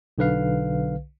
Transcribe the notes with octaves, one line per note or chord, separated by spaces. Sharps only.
B1 D3 B4 F5